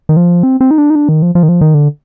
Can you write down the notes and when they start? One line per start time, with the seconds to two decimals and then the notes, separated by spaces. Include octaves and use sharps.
0.09 D#3
0.17 F3
0.43 C4
0.61 C4
0.71 D#4
0.78 D4
0.90 D#4
0.95 D4
1.09 D#3
1.22 F3
1.35 F3
1.43 D#3
1.49 F3
1.61 D#3
1.74 D3